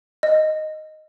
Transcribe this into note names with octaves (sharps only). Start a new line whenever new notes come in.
D#5